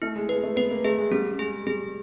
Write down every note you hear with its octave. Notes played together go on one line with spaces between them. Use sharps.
A3 E4
G#3
G#3 B4
A3
B3 B4
A#3
A3 G#4
G#3
G3 C#4
G#3 G#4
G3 G#4